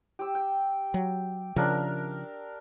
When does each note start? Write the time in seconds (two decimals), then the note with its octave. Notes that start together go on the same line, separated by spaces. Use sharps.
0.19 G4 E6
0.35 G5
0.94 F#3
1.56 C#3 F3 D4 A#4 E5
1.70 A#4